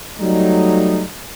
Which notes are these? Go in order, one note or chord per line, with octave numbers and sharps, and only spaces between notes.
F#3 G3 A3 D#4